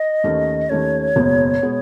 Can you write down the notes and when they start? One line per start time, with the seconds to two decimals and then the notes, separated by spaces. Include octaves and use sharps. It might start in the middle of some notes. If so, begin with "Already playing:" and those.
Already playing: D#5
0.24 D#2 D#3 A3 C#4
0.70 D#2 D#3 A3 C#4 C#5
1.16 F#1 E2 B2 G#3 B3
1.62 B2 G#3 B3